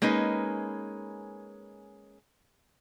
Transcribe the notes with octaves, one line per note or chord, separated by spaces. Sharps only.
G#3 A#3 C#4 D#4 B4